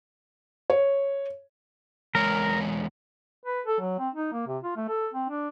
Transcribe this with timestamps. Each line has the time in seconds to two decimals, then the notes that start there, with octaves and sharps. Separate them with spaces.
0.70 C#5
2.15 E2 G#3 A#4 C#5
3.45 B4
3.67 A4
3.80 F#3
3.99 C4
4.15 D#4
4.33 A#3
4.47 C3
4.64 F4
4.76 A3
4.88 A4
5.14 C4
5.29 D4